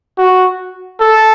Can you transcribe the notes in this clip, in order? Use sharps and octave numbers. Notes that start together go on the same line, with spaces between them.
F#4
A4